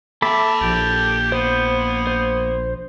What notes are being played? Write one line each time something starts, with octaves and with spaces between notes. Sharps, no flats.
A#3 A4 E5 G5 B5 D6
A#1 G4
B3 C5
C5